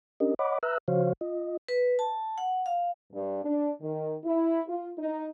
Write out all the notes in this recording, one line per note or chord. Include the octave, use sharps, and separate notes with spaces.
C#4 D4 G4 A#4 D#5
C#5 D#5 F#5 B5 D6
B4 E5 A#5 E6 F#6
C#3 F3 F#4 C5 C#5 F5
F4 D#5
B4
A5
F#5
F5
G2
D4
D#3
E4
F4
D#4